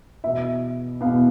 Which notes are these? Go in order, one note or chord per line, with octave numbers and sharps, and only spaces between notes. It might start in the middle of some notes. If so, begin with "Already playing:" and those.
E2 B2 B3 E5
E2 B2 B3 F5